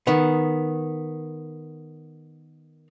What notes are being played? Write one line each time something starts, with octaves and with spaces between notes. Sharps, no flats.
D#3 B3